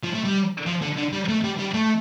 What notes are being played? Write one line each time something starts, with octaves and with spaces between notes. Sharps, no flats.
F3
A3
G3
F3
D3
D3
G3
A3
G3
G3
A3